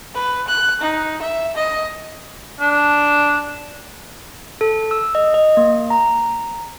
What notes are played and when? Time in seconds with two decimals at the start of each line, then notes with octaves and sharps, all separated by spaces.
0.15 B4
0.48 F#6
0.81 D#4
1.22 E5
1.55 D#5
2.61 D4
4.61 A4
4.91 E6
5.15 D#5
5.34 D#5
5.57 A#3
5.90 A#5